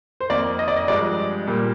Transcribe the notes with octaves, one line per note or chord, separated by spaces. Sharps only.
C5
F2 D#3 A#3 D5
D#5
D5
D#5
G2 F3 G#3 D5
A#2 G3 A#3